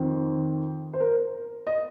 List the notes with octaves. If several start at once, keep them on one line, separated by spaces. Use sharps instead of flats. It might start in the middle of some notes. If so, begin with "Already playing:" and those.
Already playing: F2 D#3 C4
C5
A#4
D#5